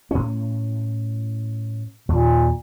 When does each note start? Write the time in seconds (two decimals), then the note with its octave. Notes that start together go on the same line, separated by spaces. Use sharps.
0.11 A2 C#4
2.09 D#2 A#2